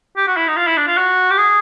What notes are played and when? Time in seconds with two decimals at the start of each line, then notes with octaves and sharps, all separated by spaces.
0.17 G4
0.27 F#4
0.37 E4
0.48 D#4
0.57 F4
0.67 E4
0.77 D4
0.87 F4
0.97 F#4
1.31 G4
1.37 G#4